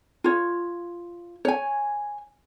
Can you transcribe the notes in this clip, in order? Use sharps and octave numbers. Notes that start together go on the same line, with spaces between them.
F4 C#5
C#5 G#5